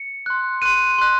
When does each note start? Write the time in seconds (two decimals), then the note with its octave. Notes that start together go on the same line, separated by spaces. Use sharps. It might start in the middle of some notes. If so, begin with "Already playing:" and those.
Already playing: C#7
0.26 C6 F#6
0.62 C6 F#6 D#7
0.98 C6 F#6